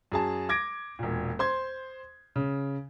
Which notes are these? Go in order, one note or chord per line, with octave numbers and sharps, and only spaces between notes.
F#2 G#4 A5
D6 G#6 A#6 D7
E1 A#2
C5 C6 G#6
C#3